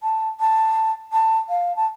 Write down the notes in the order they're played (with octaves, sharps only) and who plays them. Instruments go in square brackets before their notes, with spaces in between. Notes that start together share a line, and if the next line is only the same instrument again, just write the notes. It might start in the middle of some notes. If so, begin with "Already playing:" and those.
[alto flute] A5
A5
A5
F5
A5